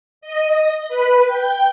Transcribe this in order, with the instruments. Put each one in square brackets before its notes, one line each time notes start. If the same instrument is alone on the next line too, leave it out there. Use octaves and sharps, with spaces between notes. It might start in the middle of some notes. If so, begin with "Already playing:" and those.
[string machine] D#5
B4
G5